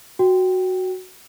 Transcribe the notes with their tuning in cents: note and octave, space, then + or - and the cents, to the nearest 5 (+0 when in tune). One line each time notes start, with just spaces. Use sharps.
F#4 +0 G5 +0